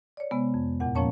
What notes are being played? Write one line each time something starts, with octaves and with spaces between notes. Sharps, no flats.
C#5 D5
C3 G#3 B3
F2
E2 A#2 F#5
A#2 F3 A#3 C#4 C#5 A5